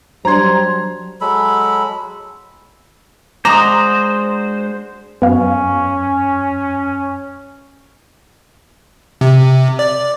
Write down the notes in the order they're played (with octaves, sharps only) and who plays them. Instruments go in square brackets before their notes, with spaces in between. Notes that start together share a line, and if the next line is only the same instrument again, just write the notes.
[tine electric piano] F#3 [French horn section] G3 D4 [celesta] C5 G#6 [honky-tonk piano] A#5 C6
[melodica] F#3 G#3 A4 B5
[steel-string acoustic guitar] G#3 D4 F#4 [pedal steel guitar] C5 [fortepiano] A#5 [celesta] D6 D#6
[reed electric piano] F#2 [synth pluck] B3 F5 [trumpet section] C#4
[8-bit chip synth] C3
D5